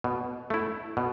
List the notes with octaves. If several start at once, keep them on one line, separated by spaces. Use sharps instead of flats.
B2
A3 E4
B2